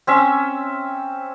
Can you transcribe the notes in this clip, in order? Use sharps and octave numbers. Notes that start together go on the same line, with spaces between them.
C4 C#4 E5